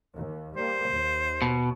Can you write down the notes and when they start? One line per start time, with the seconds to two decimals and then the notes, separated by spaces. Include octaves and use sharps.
0.14 D#2
0.56 G3 A#3 C5
0.91 D#2
1.42 B2